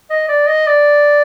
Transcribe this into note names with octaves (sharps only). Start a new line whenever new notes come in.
D#5
D5
D#5
D5